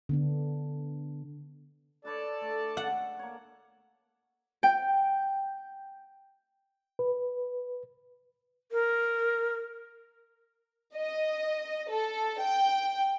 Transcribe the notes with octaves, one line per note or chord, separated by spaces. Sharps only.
D3 B3 D4
D4 A4 B4 C#5 D5 A5
A3
F#5
A#3 C#5
G5
B4
A#4
D#5
A4
G5